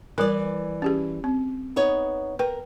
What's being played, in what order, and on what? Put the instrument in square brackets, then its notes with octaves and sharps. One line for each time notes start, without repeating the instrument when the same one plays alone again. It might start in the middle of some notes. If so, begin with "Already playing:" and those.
[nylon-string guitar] E3 D5 [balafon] G3 A#4
[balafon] C#4 G4 G#4
C4
[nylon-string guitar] B3 D#4 C#5
[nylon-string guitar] A#4 [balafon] B4 G5